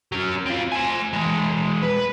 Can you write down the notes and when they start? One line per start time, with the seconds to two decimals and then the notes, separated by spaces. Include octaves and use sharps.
0.12 F#3 C#4
0.46 C4 F4
0.72 C5 G#5
1.13 E3 G#3
1.83 B4